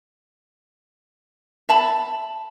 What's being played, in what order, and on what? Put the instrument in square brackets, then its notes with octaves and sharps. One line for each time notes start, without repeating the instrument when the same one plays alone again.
[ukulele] E5 A5 B5